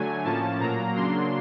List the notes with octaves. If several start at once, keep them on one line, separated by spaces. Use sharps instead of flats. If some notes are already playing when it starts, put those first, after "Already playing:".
Already playing: D3 F#3 A3 G#5
A2 F3 A#3 C#4 A5
A#2 F#3 A#3 A#5
C#3 F#3 A#3 D4 C6